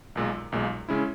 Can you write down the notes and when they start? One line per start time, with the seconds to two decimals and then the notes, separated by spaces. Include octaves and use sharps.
0.15 B1 A#2 G#3
0.52 B1 A#2 G#3
0.89 C#3 G#3 C#4 E4